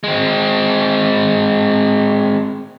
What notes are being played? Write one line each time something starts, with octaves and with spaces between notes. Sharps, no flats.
G#3 C4